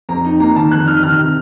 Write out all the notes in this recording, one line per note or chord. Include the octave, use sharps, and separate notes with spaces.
F2 A#5
D#4
A#3 A#5
D#3 A5
F2 F#6
D#4 F6
D#3 F6
C3